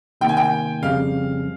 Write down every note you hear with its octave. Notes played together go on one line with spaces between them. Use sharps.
C3 D#3 A#3 G5
G#5
G5
F2 C#3 G3 F5